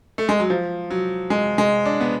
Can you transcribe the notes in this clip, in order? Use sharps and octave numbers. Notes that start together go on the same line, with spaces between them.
A3
G#3
F#3
F3
F#3
G#3
G#3
D4
B3